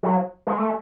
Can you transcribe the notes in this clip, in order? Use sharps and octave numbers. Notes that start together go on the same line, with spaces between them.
F#3
G#3
A3